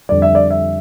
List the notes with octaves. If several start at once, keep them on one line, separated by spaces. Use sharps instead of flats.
F2 D3 G3 D5
E5
D5
E5